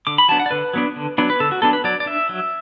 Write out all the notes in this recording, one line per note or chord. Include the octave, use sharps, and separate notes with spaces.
D3 D6
B5
F#3 B3 D4 A5
F#5
D5
D3 B4
F#3 B3 D4
D3
F#3 B3 D4
B4
D3 A4
F#4
F#3 B3 D4 A4
B4
F#3 D5
D5
D4 E5
F#3